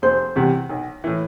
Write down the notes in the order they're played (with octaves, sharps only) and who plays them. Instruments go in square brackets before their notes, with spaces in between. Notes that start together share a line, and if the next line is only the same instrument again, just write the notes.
[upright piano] F1 [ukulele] C5
[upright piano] E2 C3 G3
B1
A2 E3